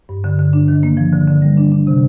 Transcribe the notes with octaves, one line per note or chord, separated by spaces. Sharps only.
G2
D3
D3
D4
D#3
A#3
F3
D3
D3
G3
D4
D4
C3